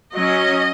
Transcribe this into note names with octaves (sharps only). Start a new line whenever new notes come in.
F#3 C#4 D#5